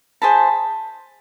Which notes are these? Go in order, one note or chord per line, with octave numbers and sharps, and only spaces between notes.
E4 G#4 C5 A5 B5